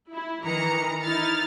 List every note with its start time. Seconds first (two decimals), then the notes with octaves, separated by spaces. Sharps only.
0.11 E4
0.43 D#3 E3 A#5 C#7
1.03 D#4 E4 F6 A6